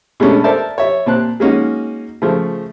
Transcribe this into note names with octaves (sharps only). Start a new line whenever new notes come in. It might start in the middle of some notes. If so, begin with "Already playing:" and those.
B2 G#3 A3 C#4 D4
A4 A#4 C5 D5 E5 A5
C#5 E5
A#2 C4 A5 F#6
G#3 A#3 C#4 D#4 F#4
C#3 F3 A3